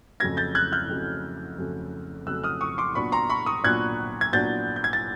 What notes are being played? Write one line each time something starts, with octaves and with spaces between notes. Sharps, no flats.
F2 C#3 F#3 A3 G#6 A#6
G6 A6
F#6 G#6
F6 G6
F2 C#3 F#3 A3
F2 C#3 F#3 A3
F2 C#3 F#3 A3 E6 F#6
D#6 F6
C#6 D#6
C6 D6
A#2 F#3 B3 D4 B5 C#6
A#5 C6
B5 C#6
C#6 D#6
A#2 F#3 B3 D4 F#6 G#6
G#6
A#2 F#3 B3 D4 G6 A6
G6
G#6
A6